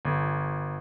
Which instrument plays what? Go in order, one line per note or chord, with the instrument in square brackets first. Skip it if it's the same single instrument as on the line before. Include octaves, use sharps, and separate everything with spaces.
[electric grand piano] G1